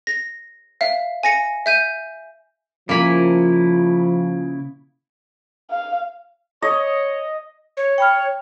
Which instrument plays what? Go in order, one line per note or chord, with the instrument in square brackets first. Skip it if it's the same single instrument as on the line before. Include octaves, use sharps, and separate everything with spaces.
[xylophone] A#6
E5 F5
G#5 A#6 C#7
E5 G6 D#7
[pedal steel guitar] C#3 E4 G#5 [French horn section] F3 [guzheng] A#3 B5
[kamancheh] F5
[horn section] C#5 [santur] D#5
[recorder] C#5
[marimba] G5 B5 F6